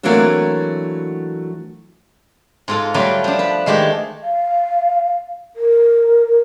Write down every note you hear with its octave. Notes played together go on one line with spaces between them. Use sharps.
E3 F#3 A3 A#3 C4 D4
G#2 F4 A4
F#3 G3 A3 F4 B4 D5
F3 D4
B4
D#3 G#3 A3 G4
F5
A#4